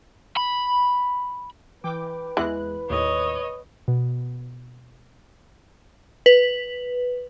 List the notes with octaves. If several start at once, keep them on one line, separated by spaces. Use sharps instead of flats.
B5
E3 B4 G5 D6
E2 E3 G#3 F#6
D#2 A2 C#5 D#5
B2
B4